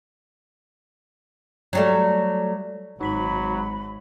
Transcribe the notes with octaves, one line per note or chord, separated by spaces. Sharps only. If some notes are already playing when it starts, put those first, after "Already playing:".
F#3 G3 A3
G#1 F#3 D#4 B5 B6 F#7